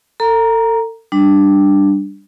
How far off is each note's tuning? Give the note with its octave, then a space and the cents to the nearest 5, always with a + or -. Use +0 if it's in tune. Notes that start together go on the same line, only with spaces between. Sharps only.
A4 +35 A#5 +5
G3 +0 D4 +0